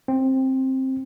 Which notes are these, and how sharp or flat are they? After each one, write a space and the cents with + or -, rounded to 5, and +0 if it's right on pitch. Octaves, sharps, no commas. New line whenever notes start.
C4 +10